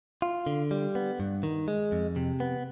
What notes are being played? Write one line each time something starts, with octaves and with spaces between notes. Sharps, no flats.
F4
D3
G3
B3
G2
D#3
G#3
F2
C3
B3